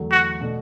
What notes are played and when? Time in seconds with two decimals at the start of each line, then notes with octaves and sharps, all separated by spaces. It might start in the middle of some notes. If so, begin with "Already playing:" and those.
Already playing: E2 D3 F#3 A3
0.12 F#4
0.40 B2 A3 D4